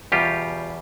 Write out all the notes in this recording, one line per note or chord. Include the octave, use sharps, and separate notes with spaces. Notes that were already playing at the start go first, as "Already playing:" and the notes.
E2 B2 G3 F4 G4